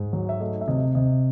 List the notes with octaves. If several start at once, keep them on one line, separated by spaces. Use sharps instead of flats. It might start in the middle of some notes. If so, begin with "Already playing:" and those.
Already playing: G#2
F#3
E5
A3 D#5
E5
C3 D#5
C3 D#5